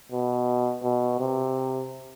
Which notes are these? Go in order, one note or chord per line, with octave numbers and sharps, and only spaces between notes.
B2
B2
C3